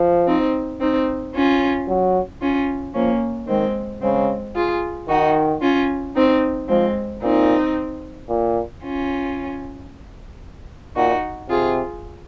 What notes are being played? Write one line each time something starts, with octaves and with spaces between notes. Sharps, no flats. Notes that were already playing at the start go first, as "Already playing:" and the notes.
Already playing: F3
C4 D#4
C4 D#4
C#4 F4
F#3
C#4 F4
F3 A#3 C#4
D#3 G#3 C4
C#3 G#3 C4
F4 G#4
D#3 D#4 F#4
C#4 F4
C4 D#4
F3 G#3 C4
A#2 C4 D#4
A#2
C#4 F4
A#2 D#4 F#4
C3 F4 G#4